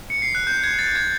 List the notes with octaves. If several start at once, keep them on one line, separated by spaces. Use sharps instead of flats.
C#7
C7
F#6
G6
G#6
A6
G#6